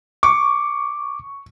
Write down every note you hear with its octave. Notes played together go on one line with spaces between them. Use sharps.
C#6 D6